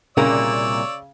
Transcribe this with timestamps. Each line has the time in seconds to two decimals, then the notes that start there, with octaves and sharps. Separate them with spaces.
0.17 C2 A#2 C#3 A#3 C#5 D5 E6